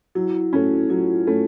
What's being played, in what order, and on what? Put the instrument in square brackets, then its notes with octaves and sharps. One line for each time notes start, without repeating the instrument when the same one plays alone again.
[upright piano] F#3 [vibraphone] E4
[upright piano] A3 C#4 [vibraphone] E4 F#4
[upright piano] F#3 [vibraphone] F4
[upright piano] A3 C#4